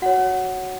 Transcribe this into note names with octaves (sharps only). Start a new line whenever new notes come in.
F#4 C#5 F#5